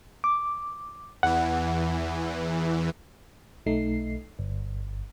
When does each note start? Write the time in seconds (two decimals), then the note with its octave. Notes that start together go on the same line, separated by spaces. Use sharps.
0.24 D6
1.23 E2 E3 F#5
3.66 B1 A3 D#4 C7
4.39 G1